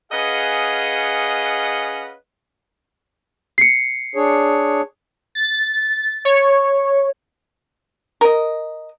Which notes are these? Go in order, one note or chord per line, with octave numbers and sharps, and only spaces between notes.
C#4 G#4 B4 D#5 F5 F#5
C7 C#7
D4 G#4 C#5
A6
C#5
A#4 D#5